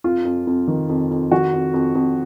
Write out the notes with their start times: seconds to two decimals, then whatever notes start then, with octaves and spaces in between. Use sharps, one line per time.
0.04 F2 F4
0.25 F2
0.47 F2
0.68 D#3
0.89 F2
1.11 F2
1.32 D#3 F#4
1.53 F2
1.74 F2
1.95 F2